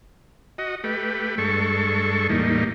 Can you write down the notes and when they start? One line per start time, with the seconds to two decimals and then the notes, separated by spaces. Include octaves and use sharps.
0.58 F#4 D#5
0.84 A3 G4 B4
1.38 G2 G#3 A4 C#6
2.29 E2 A2 G3 A#3 D#4